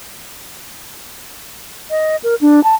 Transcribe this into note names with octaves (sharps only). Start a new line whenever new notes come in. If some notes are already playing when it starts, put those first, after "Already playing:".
D#5
A#4
D4
A5